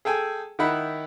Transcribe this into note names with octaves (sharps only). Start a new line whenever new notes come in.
G#4 A4 G5 G#5
D#3 D#4 E4 F#5 B5